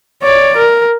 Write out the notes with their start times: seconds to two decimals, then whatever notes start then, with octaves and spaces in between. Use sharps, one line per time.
0.23 C#5 D5
0.57 A#4